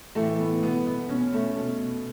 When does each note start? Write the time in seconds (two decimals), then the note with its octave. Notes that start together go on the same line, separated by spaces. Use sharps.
0.15 A2 E3 A3
0.40 B3
0.63 B2 B3
0.86 B3
1.09 B2 C#4
1.33 A3
1.56 B2